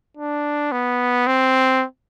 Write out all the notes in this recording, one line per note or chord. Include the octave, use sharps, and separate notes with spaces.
D4
B3
C4